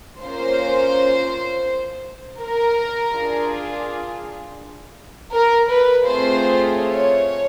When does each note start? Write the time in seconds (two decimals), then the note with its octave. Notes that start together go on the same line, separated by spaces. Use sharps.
0.22 A#3 C#4 F4 C5
2.40 A#4
3.14 D4 F4 G#4
5.32 A#4
5.69 B4
6.05 A3 C4 F4 G#4 C5
6.78 C#5